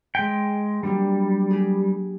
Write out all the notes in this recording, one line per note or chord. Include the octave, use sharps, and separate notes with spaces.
G#3 G5 G6 B6 D7
F#3 G3 A#3 D4
G4 G#4